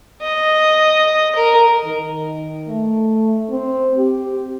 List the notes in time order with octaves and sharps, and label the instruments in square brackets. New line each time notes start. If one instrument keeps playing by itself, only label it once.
[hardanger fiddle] D#5
A#4
[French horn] D#3
A3
C4
G4